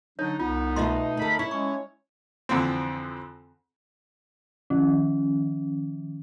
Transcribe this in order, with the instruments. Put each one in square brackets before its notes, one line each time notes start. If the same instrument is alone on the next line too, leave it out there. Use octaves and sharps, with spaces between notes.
[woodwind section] D3 F#3 D4 [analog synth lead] D#4 [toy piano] C#5
[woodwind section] C2 B3 [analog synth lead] D#4 [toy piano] F4
[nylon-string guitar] B2 A3 [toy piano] F4 D#5 C6
[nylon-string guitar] D2 A4 [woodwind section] A#4 B5
[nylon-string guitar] E4 [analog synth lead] C#5
[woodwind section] G#3 C#4 [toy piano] C#6
[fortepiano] F2 D3 E3 C4
[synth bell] D#3 F3 C#4